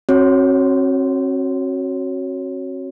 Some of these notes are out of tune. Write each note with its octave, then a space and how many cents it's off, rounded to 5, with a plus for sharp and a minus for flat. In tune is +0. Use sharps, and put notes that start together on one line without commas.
C4 +45 F#4 +0 C#5 +0